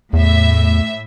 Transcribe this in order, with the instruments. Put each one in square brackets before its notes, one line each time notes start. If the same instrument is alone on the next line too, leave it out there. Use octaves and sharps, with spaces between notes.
[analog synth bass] E2 [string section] A2 E5